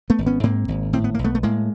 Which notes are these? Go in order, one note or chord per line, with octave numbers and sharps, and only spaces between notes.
A3 B3
G#1
B3 C#4
G#2 A#3 C4
G#1
A2 C4
B3
A#3
B1
A3 B3
A3
A2 G#3 A#3